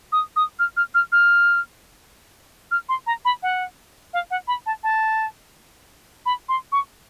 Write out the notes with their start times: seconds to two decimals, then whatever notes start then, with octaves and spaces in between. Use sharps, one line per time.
0.12 D#6
0.36 D#6
0.59 F6
0.77 F6
0.95 F6
1.12 F6
2.71 F6
2.89 C6
3.07 A#5
3.25 B5
3.43 F#5
4.14 F5
4.31 F#5
4.48 B5
4.66 A5
4.84 A5
6.26 B5
6.49 C6
6.72 C#6